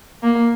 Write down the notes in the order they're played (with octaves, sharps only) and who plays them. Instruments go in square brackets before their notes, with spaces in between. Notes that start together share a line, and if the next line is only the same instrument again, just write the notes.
[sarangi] A#3